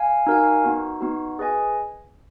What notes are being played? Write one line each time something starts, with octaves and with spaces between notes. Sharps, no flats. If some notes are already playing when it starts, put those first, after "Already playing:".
Already playing: F5 G#5
D#4 F#4 A#4 F5 G#5
B3 D#4 F#4
B3 D#4 F#4
G#4 B4 D#5 G#5